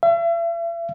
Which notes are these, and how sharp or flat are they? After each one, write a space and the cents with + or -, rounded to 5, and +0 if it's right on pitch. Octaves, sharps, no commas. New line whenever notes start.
E5 +40